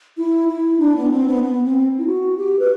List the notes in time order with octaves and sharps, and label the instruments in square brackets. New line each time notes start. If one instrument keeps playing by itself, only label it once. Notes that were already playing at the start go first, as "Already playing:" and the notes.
[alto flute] E4
E4
D4
B3
C4
B3
B3
C4
E4
F#4
G4
B4